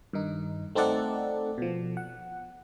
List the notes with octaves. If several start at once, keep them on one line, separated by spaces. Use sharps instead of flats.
G2 D#3 D#4
A3 C4 D#4 A4 D5 F#5
B2 F3
F#5